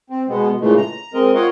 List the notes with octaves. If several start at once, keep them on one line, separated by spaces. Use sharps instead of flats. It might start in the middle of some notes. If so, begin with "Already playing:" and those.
C4
B2 G#3 B3
A#2 C#3 E3 G#3 A3
A#5
G#3 C4 A#4 D#5
F4 A#4 C#5 D#5 F5 F#5